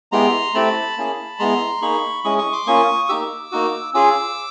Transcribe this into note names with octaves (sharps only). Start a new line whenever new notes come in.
G#3 B3 E4 G4 A#5 C6
A3 C4 E4 G4 A5 B5
A#3 C#4 E4 G#4
G#3 B3 E4 A#5 C6
A#3 D#4 G#4 B5 C#6
G#3 C#4 E4 C#6 D#6
C#6 D#6
C6 D6
A#3 C#4 F4 C#6 D#6
A#3 D#4 G4 D6 E6
A#3 D#4 F#4
C#4 F4 G#4 D6 E6